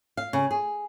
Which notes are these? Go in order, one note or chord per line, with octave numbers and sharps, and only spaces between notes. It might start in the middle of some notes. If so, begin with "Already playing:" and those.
F5
C#3
G#4